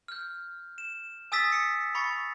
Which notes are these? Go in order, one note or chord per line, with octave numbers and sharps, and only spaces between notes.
F6 G6
E7
G#5 D#6 E6 A6 B6
C#7
B5 C#6 A6 C#7